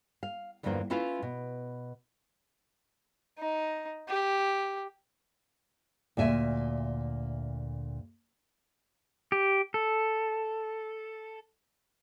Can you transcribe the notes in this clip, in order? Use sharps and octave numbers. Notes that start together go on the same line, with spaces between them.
F5
E2 G2 D3 F3 A#3 C5
A3 C#4 E4 F4 B4 F5
B2
D#4
G4
D2 A#2 E5 G#5
G4
A4